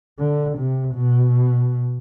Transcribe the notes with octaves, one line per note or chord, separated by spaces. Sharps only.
D3
C3
B2